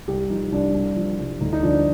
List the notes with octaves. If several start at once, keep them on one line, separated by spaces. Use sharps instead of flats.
C2 G4
F3 D#4
C2 D4
C2
F3
C2
D2 D#4
D#4
F3 D4